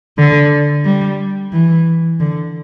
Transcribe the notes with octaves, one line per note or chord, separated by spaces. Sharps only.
D3
G3
E3
D3